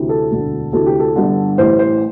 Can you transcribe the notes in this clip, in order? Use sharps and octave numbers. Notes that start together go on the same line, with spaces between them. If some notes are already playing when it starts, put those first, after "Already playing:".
Already playing: D2 C3 E3
A4
E1 D2 D3
D2 C3 E3 A4
G4
A4
G1 G2 D3
A1 A2 E3 C5
C5